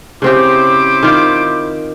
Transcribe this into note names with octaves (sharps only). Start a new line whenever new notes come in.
C#3 C4 E4 G4 C5 D6
D#3 F4